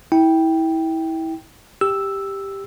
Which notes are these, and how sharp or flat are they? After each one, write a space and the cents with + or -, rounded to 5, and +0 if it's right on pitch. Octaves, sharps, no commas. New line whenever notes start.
E4 -25 G5 +0
G4 +5 E6 +0